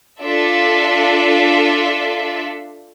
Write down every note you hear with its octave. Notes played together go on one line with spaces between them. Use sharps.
D4 F4 A4 D5 E5